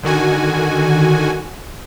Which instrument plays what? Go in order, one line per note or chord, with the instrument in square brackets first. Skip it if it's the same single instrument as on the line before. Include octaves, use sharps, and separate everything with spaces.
[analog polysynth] D3 D#3 F#4 G#5